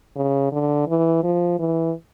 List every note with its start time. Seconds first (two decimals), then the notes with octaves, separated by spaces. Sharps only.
0.16 C#3
0.52 D3
0.87 E3
1.23 F3
1.59 E3